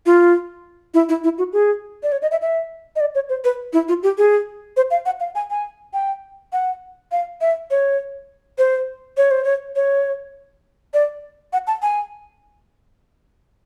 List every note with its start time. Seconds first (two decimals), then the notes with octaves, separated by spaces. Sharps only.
0.06 F4
0.94 E4
1.09 E4
1.24 E4
1.38 F#4
1.53 G#4
2.03 D5
2.12 C#5
2.22 D#5
2.31 E5
2.41 E5
2.96 D#5
3.00 D5
3.15 C#5
3.29 C5
3.44 B4
3.73 E4
3.88 F4
4.03 G4
4.18 G#4
4.77 C5
4.91 F5
5.06 F#5
5.20 F5
5.35 G#5
5.50 G#5
5.93 G5
6.53 F#5
7.12 F5
7.41 E5
7.71 C#5
8.58 C5
9.17 C#5
9.31 C5
9.44 C#5
9.76 C#5
10.94 D5
11.53 F#5
11.67 A5
11.82 G#5